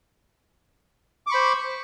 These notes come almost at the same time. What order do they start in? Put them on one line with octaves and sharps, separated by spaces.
D6 C#6 B5 C5